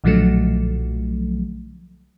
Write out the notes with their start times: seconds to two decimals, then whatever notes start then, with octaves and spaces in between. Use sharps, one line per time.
0.04 B1 A#2 D3 F3 F#3 A3